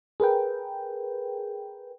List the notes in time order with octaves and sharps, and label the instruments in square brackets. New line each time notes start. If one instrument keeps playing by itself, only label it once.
[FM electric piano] G#4 A#4 B4 G5